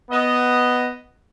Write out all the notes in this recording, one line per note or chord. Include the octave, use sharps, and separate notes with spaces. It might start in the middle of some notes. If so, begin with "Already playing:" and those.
B3 D#5